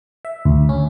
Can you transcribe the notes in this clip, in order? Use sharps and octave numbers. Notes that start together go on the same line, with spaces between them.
E5
D2
C#4